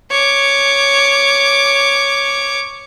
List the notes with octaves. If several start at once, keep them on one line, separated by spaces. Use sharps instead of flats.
C#5 D6